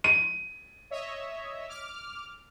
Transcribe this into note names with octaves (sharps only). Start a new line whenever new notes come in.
D#7
C#5 D#5 E5
D6 F6